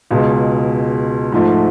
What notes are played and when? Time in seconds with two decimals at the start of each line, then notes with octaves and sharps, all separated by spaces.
0.11 C#2 B2 G#3
1.32 G#2 F3 A3